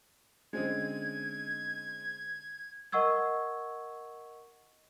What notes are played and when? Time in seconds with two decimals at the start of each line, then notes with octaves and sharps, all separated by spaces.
0.53 D3 G#3 C4 C#4 D#4 G#6
2.92 A#4 D#5 F#5 C#6 E6 G#6